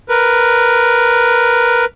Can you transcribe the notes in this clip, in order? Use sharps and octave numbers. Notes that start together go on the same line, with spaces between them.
A#4 B4